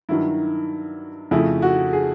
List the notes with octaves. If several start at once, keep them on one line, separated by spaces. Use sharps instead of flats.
G2 D#3 F#3 E4
F2 C#3 F3 A3 E4
F#4
G#4